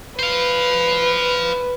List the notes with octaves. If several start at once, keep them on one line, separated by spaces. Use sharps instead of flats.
B4 C5 F5